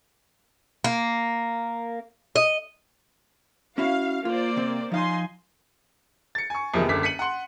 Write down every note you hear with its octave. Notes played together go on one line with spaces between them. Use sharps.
A#3
D#5
C#4 E4 F#4 F5
A#3 F4 C5 D5
C3 C4
F3 D#4 F5 G#5 C6
A6 C#7
G#5 C#6
E2 C3 D#3 F3 A#3
F#1 C2 D3 D6 B6
B6 C#7 D#7 F#7
F#5 C6